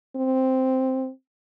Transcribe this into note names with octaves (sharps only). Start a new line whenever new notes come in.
C4